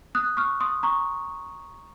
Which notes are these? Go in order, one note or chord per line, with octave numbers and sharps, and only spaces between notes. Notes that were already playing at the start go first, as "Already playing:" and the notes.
D#6 F#6
C#6 F6
C6 D#6
A#5 C#6